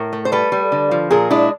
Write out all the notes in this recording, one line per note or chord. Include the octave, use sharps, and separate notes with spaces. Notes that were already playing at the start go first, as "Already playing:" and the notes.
Already playing: A2 A#4
A3
C5
G3 A4 B4
G3
D3
F3
A#2 G#4 A#4
G#3 D4 E4